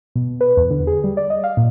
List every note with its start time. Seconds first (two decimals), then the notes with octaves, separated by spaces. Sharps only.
0.15 B2
0.41 B4
0.57 E2
0.70 D3
0.87 G#4
1.04 G3
1.17 D5
1.30 D#5
1.44 F5
1.57 A#2